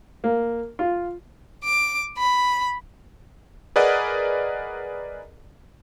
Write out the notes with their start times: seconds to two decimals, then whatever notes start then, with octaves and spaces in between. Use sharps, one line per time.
0.24 A#3
0.79 F4
1.64 D6
2.17 B5
3.76 G#4 A#4 B4 D5 D#5 F#5